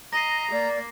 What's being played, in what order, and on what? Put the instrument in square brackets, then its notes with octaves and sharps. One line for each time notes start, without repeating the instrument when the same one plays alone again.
[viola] D#5 [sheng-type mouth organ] A#5 [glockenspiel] A#6 C7
[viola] A#3 [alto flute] D5